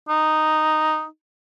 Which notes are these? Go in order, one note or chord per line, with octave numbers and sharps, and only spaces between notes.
D#4